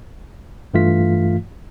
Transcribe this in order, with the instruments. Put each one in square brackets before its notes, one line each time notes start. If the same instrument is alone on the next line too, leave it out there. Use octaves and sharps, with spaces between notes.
[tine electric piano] G2 E3 A3 F4 F5 B6